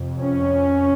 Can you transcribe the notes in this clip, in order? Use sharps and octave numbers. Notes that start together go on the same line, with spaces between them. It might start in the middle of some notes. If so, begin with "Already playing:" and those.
Already playing: F2 C3
C#4